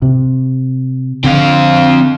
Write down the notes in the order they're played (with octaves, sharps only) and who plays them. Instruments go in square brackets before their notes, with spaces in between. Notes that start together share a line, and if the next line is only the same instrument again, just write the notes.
[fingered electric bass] C3
[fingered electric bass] D3 [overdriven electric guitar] C4 F5